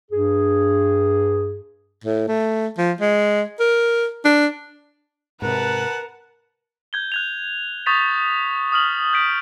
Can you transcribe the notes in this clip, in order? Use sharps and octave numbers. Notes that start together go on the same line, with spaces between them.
G2 G#4
A2
A3
F3
G#3
A#4
D4
G#2 C3 A#4 B4 F#5 A5
G6 G#6 G7
F#6 G#6 F7
C#6 D#6 G6 A6 B6 F7
D#6 F6 F#7
G6 B6 D7